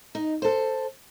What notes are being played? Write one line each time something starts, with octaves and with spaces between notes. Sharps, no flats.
D#4
A4 C5